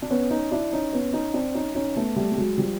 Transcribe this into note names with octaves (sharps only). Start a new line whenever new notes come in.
D4
B3 C#4
C#4 D#4
D4 E4
C#4 D#4
B3 C#4
C#4 D#4
C4 D4
C#4 D#4
C#4 D#4
A3 B3
G3 A3
G3
F#3 G#3
F3 G3